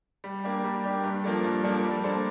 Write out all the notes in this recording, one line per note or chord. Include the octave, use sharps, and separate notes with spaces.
G3
A#3 D4 G4
G3
A#3 D4 G4
G2
F3 A#3 D4 A4
G2
F3 A#3 D4 A4
G3
A#3 D4 A4 C5